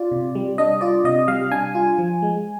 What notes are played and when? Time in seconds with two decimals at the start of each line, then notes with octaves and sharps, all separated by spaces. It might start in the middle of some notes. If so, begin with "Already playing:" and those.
Already playing: F4 D5
0.11 C3
0.35 G3
0.58 D4 D#5
0.81 F4 D5
1.04 C3 D#5
1.28 G3 F5
1.51 D4 G#5
1.75 F4
1.98 F3
2.22 G#3